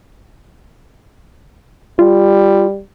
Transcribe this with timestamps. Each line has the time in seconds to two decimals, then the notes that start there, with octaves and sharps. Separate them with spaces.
1.99 G3 F4